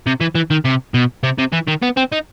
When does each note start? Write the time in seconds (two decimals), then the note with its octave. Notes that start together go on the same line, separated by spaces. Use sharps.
0.06 C3
0.20 E3
0.35 E3
0.51 D#3
0.65 C3
0.94 B2
1.23 C3
1.39 C3
1.53 E3
1.68 D#3
1.83 B3
1.97 C4
2.12 D#4